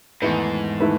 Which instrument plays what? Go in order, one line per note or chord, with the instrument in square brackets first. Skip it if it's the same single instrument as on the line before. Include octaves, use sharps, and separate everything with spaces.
[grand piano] E2 D#3 A3 E4 B4 [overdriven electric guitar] G#2
[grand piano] D#3 A3 E4 B4